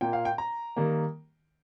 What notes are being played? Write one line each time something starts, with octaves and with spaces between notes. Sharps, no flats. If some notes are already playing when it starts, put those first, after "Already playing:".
A#2 A#3 G5
F5
G5
A#5
D#3 G3 A#3